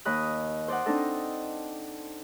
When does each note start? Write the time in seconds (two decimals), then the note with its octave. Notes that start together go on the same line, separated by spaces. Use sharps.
0.05 D#2 D#5 B5 F#6
0.68 C5 D5 D#5 F#5
0.85 C4 D4 D#4 A4 D#5